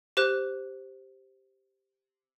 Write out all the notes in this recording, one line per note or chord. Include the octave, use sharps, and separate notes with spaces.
G4 C5 F#6